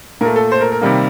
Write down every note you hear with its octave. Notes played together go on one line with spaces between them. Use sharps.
A#2 A3 A#4
A4
C5
A#4
A#4
C3 D#3 G3 A#3